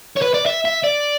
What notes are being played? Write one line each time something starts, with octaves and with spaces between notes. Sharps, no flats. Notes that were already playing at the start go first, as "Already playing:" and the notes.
C#5
B4
D5
E5
E5
D5